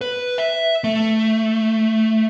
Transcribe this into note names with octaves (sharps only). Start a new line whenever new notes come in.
B4
E5
A3